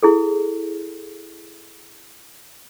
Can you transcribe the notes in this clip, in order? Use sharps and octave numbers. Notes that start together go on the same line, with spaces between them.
E4 G#4 A4